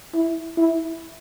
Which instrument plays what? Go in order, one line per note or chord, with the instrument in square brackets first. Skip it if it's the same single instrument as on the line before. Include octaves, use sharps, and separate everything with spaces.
[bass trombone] E4
E4